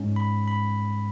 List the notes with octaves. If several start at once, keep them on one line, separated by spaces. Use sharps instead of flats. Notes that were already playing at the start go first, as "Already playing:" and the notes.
Already playing: G#2 G#3 C#4
B5
B5